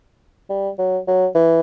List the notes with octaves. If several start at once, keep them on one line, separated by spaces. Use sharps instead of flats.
G3
F#3
F#3
E3